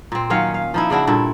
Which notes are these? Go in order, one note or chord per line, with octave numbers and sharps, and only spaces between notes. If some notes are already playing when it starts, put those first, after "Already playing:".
A#2 C4
D#3 F#3 C#4 F5
F5
F3 D#4 E4
C#3 D4 E4 F#4
G2 A#2 E4 A4